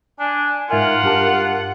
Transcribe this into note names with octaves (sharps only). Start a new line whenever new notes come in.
D4 G#5
G#2 F4 A#4 E5 F#5 G#5
G2 G4 A5